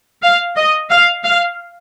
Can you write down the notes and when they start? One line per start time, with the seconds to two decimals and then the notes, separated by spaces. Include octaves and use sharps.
0.23 F5
0.56 D#5
0.90 F5
1.24 F5